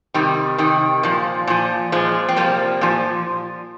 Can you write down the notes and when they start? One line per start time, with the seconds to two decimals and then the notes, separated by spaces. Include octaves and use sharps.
0.14 C3 D#3 G3
0.58 C3 D#3
1.03 A#2 F3
1.47 A#2 F3
1.92 A#2 F3 G#3
2.29 C4
2.36 C3 F3 G3 A#3
2.81 A#2 F3